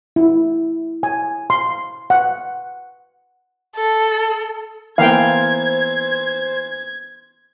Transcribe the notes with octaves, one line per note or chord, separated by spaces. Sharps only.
E4
G#5
C6
F#5
A4
E3 A#3 B3 C5 F5 G5 G#6